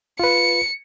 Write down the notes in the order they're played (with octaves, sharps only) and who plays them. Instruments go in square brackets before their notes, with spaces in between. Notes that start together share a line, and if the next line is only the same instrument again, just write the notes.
[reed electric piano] F4 B4 [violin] C#7